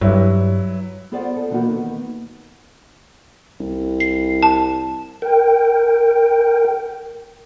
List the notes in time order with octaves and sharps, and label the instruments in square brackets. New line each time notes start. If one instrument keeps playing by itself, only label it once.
[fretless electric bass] G2 [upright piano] F#3 E4
[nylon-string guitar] B3 F4 G#4 C5 D5 F#5
A4
B2 D3 E3 A#3 D#4 F#4
D#3 A#3 B3
[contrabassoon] C2
[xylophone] C7
A5
[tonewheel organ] A#4 G5